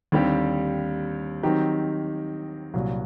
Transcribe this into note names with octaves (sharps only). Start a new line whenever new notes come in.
D#2 D3 G3 C4 G4
D#3 F#3 C4 D#4 G4
C2 A#2 F#3